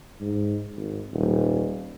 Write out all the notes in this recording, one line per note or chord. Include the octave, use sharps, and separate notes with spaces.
G#2
G#1
D#1